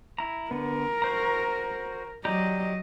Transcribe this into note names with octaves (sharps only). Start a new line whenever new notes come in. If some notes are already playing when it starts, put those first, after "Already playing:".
E4 A#5
D3 B3 A#4
F#4 C5 A#5
F#3 G4 D5 D#5 A#5